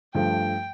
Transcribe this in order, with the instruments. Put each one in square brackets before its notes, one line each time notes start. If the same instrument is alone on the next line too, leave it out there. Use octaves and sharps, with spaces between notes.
[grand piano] G2 F3 A3 [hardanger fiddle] G5